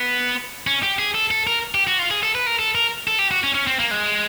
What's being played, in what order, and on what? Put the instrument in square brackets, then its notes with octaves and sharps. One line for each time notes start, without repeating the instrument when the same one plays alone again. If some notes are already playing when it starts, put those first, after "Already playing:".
Already playing: [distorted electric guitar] B3
C#4
G4
G#4
A4
A4
A#4
G4
F#4
F4
G#4
A4
B4
A#4
A4
A#4
A4
G4
F#4
C#4
C#4
C4
A#3
G#3